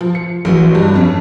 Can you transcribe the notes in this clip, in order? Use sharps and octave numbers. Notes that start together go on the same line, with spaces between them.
F3
C#7
A1 E3 F#4
G2 G3
F2 C#4